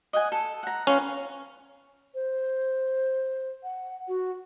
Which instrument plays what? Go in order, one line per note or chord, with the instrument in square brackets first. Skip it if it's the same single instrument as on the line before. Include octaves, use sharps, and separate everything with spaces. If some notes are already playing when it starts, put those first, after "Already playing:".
[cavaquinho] D#5 F#5 G#5
A4
F#5 A#5
[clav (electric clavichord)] C#4 [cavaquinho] F4 B4 C#6
[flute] C5
F#5
F#4